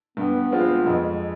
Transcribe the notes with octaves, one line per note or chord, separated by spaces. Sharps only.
G2 B3
F3 G#3 B3 C4 F4
F2 G#3